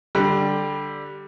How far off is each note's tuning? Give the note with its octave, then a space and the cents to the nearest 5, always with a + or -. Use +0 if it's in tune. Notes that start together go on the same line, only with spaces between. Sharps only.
D3 +0 G3 +0